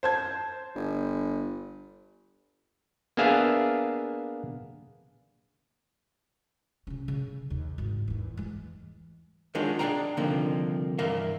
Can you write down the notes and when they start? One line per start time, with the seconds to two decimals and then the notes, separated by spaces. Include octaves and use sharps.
0.03 C5 A5 G#6
0.75 G1
3.17 A#3 B3 D4 G#4 E5 F5
6.87 C#3 C#4
7.08 C#3
7.50 D#2
7.78 G#1
8.08 E2 D#3
8.37 E3 G#3
9.55 D#3 F#3 G#3 D4 F4
9.79 D4 G#4 B4 F5 G5 A#5
10.17 C2 D3 D#3 F3 A#3 C4
10.98 G2 E3 A#4 E5 F5